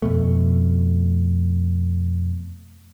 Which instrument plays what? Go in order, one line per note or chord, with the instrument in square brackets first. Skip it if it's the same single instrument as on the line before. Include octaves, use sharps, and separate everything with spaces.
[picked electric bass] F2 B2 A3